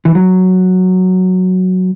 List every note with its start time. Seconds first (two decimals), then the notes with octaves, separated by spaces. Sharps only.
0.05 E3
0.15 F#3